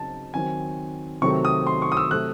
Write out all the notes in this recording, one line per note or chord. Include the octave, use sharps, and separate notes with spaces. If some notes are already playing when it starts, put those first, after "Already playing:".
Already playing: C#3 F#3 C4 D#4 A5
D#3 F#3 C4 G#5
C3 D#3 F#3 A3 C4 C#6
D#6
C6
C#6
D#6
E6
C3 F#3 A3 F#6